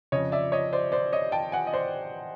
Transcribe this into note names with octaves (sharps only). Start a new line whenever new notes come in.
F2 C#3 F3 C#5 D#5
D5 E5
C#5 D#5
C5 D5
C5 D5
C#5 D#5
G5 A5
F#5 G#5
D#5
C5 D5